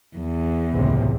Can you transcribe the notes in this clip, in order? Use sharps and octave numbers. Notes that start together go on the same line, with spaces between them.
E2
C#2 A2 C3